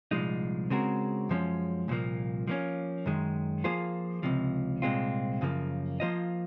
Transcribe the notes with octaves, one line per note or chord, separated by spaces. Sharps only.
C2 A#2 F3 G#3 D#4
C#3 G#3 C4 F#4 A#4
F#2 F3 G#3 C#4
C2 A#2 F3 A#3
F3 A#3 C#4
F#2 D#3 G#3
F3 A#3 F4 G#4 C5
C#2 C3 F3
C2 A#2 G#3 C4 F4
F#2 C#3 F3 A#3
F3 A#3 F4 C5 D#5